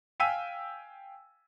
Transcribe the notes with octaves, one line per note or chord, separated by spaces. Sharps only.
F5 G5 G#5 E6 B6 D#7